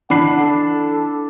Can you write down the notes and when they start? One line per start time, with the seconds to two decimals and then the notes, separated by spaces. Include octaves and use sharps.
0.10 E3 D4 F#5 B5 C7
0.39 A4